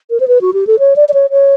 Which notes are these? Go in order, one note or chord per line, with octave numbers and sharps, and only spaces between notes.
A#4
C5
B4
F#4
G4
A4
C#5
D5
D5
C#5
C#5